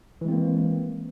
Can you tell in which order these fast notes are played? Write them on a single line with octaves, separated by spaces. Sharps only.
E3 G#3 C4 A#3